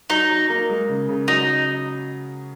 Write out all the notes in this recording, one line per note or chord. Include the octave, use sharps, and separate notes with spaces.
F#3 D#4
F#3
A#3
G#3
C#3
C#3
F#3 D#4